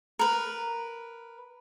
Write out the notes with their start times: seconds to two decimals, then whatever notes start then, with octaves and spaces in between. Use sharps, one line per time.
0.19 A#4 B4